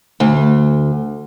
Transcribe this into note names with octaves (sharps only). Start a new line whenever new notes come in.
D2